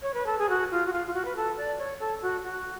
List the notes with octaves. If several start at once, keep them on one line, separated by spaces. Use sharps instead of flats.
C#5
B4
A4
G#4
F#4
F4
F#4
F4
F4
F#4
B4
A4
D5
C#5
A4
F#4
F#4